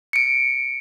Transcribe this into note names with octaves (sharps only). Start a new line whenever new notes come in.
C#7 D7